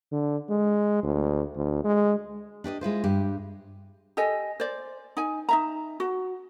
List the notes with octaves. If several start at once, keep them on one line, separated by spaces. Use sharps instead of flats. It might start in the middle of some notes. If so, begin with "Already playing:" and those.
D3
G#3
D2
D2
G#3
D4 G4 D5 D#5
G#3 E4 F4 C5
G2 G4
G4 A4 D#5 G#5
C5 D5
D#4 G#5
D#4 E5 A#5
F#4